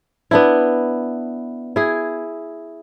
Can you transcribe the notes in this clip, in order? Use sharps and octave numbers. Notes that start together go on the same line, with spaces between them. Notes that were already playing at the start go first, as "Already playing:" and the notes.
B3 D4 E4
E4 G#4